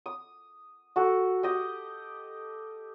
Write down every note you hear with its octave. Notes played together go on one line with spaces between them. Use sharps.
D#6
F#4 A4
G4 D#5